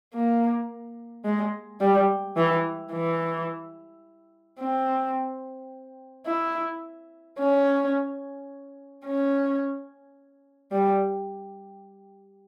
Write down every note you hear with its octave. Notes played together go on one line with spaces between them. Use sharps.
A#3
G#3
G3
E3
E3
C4
E4
C#4
C#4
G3